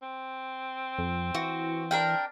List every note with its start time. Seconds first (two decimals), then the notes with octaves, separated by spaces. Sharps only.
0.03 C4
0.98 F2
1.35 E3 F#4
1.91 D4 A#4 G5